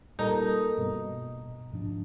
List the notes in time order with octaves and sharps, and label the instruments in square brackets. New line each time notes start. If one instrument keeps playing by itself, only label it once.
[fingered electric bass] A#2 [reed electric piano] G3 A4 A#4 [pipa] D#4
[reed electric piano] G2 B2
[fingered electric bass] G#2 F3 D4